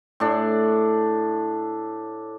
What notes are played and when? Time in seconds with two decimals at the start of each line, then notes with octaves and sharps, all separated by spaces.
0.20 A2 D4